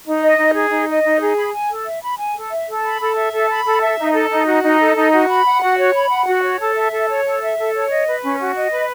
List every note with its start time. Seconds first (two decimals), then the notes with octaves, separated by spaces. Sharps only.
0.05 D#4
0.21 D#5
0.38 D#4
0.54 G#4
0.70 D#4
0.88 D#5
1.03 D#4
1.20 G#4
1.37 B5
1.53 G#5
1.68 A4
1.85 E5
2.02 B5
2.18 G#5
2.34 A4
2.51 E5
2.68 A4
2.83 B5
3.00 A4
3.16 E5
3.32 A4
3.49 B5
3.65 A4
3.82 E5
3.98 D#4
4.14 A4
4.30 D#4
4.46 F#4
4.63 D#4
4.79 A4
4.96 D#4
5.12 F#4
5.28 B5
5.45 F#5
5.61 F#4
5.78 C#5
5.94 B5
6.10 F#5
6.26 F#4
6.43 C#5
6.60 A4
6.75 E5
6.91 A4
7.09 C#5
7.25 A4
7.42 E5
7.57 A4
7.74 C#5
7.90 D#5
8.07 B4
8.23 C#4
8.40 F#4
8.55 D#5
8.72 B4